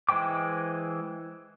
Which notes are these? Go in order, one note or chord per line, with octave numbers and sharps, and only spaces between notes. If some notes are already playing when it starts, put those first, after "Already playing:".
E3 G#3 C5 G5 D6